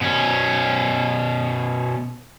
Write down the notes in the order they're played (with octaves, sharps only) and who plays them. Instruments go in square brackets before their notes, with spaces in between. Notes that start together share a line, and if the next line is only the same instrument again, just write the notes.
[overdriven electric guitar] B2 C#4